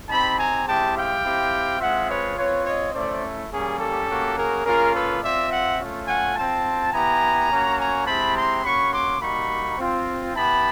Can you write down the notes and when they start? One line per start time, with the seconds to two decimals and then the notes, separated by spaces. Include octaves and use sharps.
0.09 C4 D#4 G4 A5 B5
0.37 G#5 A#5
0.66 G#3 C4 E4 G4 G5 A5
0.95 F5 G5
1.23 C4 E4 G4
1.79 G#3 C4 F4 E5 F#5
2.08 B4 C#5
2.37 C4 F4 B4 C#5
2.66 C#5 D#5
2.93 A3 C#4 E4 C5 D5
3.50 G3 A#3 C#4 G#4
3.79 G4 A4
4.08 A#3 C#4 F#4
4.36 G#4 A#4
4.64 A#3 C#4 F4 G#4 A#4
4.93 A4 B4
5.21 C4 F4 D5 E5
5.49 E5 F#5
5.79 A3 C#4 F4
6.06 F#5 G#5
6.35 C4 F4 G5 A5
6.92 B3 E4 G4 G#5 A#5
7.49 A#3 C#4 F#4
7.77 G#5 A#5
8.06 G#3 C4 E4 G4 A5 B5
8.35 A#5 C6
8.63 A#3 C#4 F#4 B5 C#6
8.91 C6 D6
9.20 G3 A#3 D#4 F#4 B5 C#6
9.78 C4 F4
10.34 B3 E4 G4 A5 B5